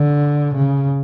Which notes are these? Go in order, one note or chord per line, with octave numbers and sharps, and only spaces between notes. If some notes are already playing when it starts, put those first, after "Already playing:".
Already playing: D3
C#3